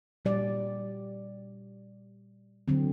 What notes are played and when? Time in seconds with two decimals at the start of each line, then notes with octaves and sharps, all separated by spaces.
0.25 A#2 G3 D5
2.68 D3 F#3 C4